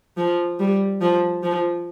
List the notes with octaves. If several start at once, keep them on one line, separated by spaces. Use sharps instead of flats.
F3
G3
F3
F3